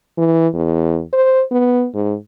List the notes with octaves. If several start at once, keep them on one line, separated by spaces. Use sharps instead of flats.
E3
E2
C5
B3
G#2